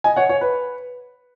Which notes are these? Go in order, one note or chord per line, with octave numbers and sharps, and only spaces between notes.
D#5 G#5
C#5 F#5
C#5
B4